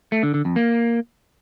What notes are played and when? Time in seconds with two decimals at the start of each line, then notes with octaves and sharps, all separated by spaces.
0.12 A3
0.23 D3
0.34 D3
0.45 F2
0.56 A#3